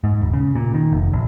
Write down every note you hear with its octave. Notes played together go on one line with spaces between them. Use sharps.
G#2
D#1
C#3
A#2
D#3
F1
A#1